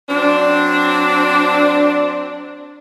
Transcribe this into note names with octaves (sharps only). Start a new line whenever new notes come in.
F#3 C4 D4